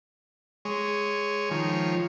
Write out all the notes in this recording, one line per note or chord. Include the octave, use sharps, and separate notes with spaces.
G#3 C#5
D#3 F3 C#5